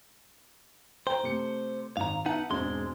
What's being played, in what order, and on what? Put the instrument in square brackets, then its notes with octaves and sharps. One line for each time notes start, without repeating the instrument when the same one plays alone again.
[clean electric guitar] C5 [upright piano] G5 A#5
[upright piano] C3 A3 C#7
[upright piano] G#1 D#3 [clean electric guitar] F5 A#5
[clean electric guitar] B3 D#4 F#5 [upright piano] E5 A5
[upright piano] E1 C4 D4 [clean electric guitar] G#2 G#3 C6